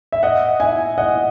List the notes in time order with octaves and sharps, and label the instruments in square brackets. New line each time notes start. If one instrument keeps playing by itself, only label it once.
[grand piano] E5
D#5 F#5
E5 G#5
D#5 F#5